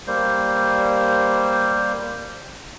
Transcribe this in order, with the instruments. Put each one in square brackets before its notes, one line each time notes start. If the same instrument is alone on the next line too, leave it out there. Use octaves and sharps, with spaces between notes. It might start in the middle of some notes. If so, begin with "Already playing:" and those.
[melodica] G3 A#3 C5